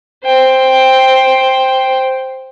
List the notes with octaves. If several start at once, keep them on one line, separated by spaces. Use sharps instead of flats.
C5 G5